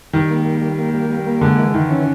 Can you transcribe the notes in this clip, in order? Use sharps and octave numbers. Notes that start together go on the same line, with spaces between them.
D#3 G3
A#3
G3
G3
A#3
G3
G3
A#3
D3 G#3
E3
D#3 E3
C#4